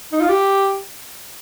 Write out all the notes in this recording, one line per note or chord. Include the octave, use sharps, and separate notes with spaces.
D#4
F4
G4